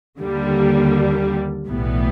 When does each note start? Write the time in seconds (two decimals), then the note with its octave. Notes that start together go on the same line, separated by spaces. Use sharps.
0.19 D#2 D3 G3 A#3
1.66 B1 A2 E3 G3 B3